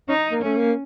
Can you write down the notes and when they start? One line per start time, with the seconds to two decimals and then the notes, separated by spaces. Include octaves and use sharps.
0.08 C#4 D#4
0.30 A#3
0.42 A3 C#4
0.57 A#3